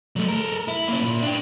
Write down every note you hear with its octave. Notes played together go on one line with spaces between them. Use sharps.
F#3 A3
A4 A#4
E4
A#3 C#4
A#2
D4 G5